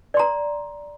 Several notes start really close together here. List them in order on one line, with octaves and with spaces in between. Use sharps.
D5 C6 A#5